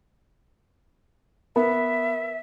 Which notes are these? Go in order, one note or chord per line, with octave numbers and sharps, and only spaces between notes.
B3 A#4 E5